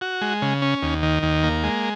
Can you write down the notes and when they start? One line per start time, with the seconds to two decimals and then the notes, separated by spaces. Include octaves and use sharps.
0.01 F#4
0.21 G#3
0.42 C#3
0.62 C#4
0.83 D#2
1.03 D#3
1.23 D#2
1.43 A#3
1.64 G#3